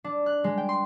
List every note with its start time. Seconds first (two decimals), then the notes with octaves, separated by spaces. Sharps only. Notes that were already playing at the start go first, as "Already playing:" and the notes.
0.04 D4
0.26 F#6
0.44 G#3
0.58 G5
0.69 C6